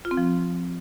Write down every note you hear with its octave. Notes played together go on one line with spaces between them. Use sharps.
F4
C4
F3